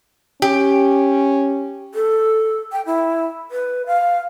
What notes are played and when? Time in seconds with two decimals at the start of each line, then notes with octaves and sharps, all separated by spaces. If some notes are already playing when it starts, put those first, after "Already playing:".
0.42 C#4 G4
1.94 A4
2.72 G5
2.86 E4
3.51 B4
3.86 F5